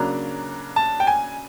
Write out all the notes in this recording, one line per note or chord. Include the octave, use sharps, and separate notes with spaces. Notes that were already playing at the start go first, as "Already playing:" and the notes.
Already playing: C#3 F#3 A#3 D4 A#5
A5
G5
G#5